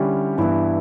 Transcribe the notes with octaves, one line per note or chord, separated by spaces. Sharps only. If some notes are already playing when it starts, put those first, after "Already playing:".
Already playing: D3 G3 C#4 E4 G4
G2 E3 B3 E4